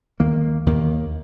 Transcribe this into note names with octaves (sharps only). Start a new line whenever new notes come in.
D#2 D#3 A#3
D#2 D#3 A#3